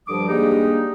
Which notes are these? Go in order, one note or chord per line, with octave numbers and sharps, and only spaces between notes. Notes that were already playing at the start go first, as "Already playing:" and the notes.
G2 D3 F3 G3 D6 D#6
G3 G#3 A#3 D4 D#4 G4